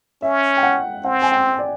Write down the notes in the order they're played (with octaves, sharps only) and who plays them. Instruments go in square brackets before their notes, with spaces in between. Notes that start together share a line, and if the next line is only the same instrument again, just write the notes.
[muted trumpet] C#4 [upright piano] E5
[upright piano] G5
F#5
[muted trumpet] C4 [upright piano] F#5
[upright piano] G#5
G5
D5